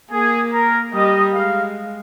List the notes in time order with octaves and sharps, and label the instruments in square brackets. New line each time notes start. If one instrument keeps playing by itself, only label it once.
[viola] A#3 [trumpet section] G#4
[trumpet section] A#4
[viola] G3 [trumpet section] D#5
[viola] G#3 [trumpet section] F5